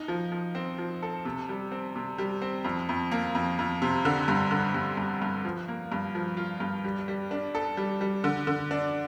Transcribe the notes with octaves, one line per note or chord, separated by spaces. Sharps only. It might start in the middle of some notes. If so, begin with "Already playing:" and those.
Already playing: D#4
F3
F3
C4
F3
A4
C3
G3
C4
C3
G3
C4
F2
F2
A#3
F2
F2
C3
D3
G2
D3
G2
G2
G2
F3
A#3
G2
F3
F4
G2
G3
G3
D4
A4
G3
G3
D3
D3
D4